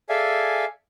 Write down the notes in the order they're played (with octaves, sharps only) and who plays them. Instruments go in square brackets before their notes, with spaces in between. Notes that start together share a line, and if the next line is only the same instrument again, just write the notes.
[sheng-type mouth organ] G#4 A4 D5 E5 F5 G#5